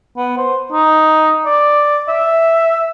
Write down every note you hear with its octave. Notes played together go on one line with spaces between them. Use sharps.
B3
C5
D#4
D5
E5